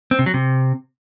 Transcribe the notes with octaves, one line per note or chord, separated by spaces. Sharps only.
C4
C3
F#3
C3